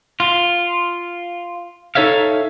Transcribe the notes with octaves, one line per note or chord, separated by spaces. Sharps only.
F4
D#4 A4 C#5 E5 F5